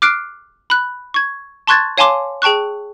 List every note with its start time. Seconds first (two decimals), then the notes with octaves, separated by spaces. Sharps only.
0.02 D6 F6 F#6 C7 D7
0.70 B5 F#6
1.14 C#6 G#6
1.67 A5 C6 C#6 F#6 G#6 A6
1.98 C#5 F5 G#5 A5 C6 D6
2.42 G#4 G5 A5 C#6 F#6